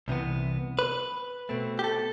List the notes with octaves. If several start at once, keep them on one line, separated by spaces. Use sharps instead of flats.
C2 C3 E3 B3
B4
B2 A3 C4
G4
A4